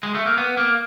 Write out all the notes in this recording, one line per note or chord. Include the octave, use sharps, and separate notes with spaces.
G#3
A3
A#3
B3
A#3